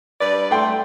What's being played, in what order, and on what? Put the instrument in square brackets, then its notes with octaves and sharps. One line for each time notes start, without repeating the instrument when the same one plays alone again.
[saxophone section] G2 B4 D5
[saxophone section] A3 [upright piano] G5 C6